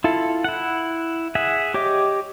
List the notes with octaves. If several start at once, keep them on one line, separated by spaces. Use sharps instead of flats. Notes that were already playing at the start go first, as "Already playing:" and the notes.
E4 F4 A4
E4 F#5
G#4 E5 F#5
G4 C#5 D#5 D6